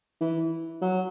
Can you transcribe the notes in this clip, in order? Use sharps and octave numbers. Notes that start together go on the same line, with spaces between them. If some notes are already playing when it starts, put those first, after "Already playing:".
E3
F#3